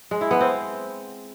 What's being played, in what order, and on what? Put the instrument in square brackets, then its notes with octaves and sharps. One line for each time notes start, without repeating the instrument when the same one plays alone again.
[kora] G#3
E4
B3
C4